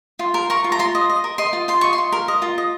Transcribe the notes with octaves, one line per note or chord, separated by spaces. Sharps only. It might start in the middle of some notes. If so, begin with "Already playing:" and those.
F4
A#4
A#4 C#6
F4
A#5
F4 C6
D#5
D#5
A#4
D#5 C6
F4
F4 C6
D#5 C#6
C6
F4
A#4
D#5
F4
D#5